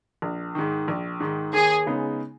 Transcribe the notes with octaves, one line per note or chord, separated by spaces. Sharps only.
A#1
G#2 D#3
A#1
G#2 D#3
D#2 G#4
C#3 G#3 B3 D#4